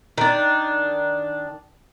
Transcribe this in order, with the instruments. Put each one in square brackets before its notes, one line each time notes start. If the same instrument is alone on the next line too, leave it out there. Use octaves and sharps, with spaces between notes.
[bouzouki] D#3 D4